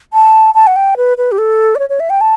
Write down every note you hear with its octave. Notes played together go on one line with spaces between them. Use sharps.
A5
A5
F#5
G5
B4
B4
G4
A4
D5
C#5
C#5
E5
G5
A5